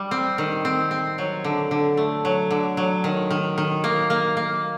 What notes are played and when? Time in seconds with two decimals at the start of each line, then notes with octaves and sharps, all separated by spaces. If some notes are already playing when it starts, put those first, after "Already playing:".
Already playing: G3
0.11 C4
0.38 D#3
0.65 C4
0.91 C4
1.18 F#3
1.44 D3
1.71 D3
1.97 A3
2.25 F#3
2.51 D3
2.77 F#3
3.04 D#3
3.31 D#3
3.58 D#3
3.84 A#3
4.10 A#3
4.37 A#3